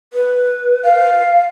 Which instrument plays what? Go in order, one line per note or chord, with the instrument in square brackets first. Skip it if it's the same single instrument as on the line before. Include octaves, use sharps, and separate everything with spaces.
[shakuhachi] B4
[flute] F5